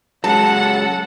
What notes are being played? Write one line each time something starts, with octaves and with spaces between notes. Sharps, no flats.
F#3 G#3 C#4 A4 F#5 A5